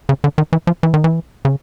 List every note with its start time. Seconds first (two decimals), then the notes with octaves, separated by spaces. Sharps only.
0.09 C#3
0.24 D3
0.38 D#3
0.53 E3
0.67 F3
0.83 E3
0.94 D#3
1.04 E3
1.45 C#3